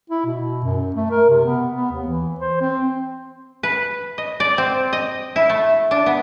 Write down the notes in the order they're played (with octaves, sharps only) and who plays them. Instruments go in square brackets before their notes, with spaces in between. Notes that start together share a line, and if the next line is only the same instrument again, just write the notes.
[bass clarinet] E4
B2
F#2
A3
A#4
C3
B3
B3
D#2
E3
C5
C4
[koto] B4
D#5
D5
C4
D#5
E4
A3
D4
B3